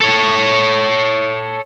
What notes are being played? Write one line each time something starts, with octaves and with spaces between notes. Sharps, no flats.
A4 C#5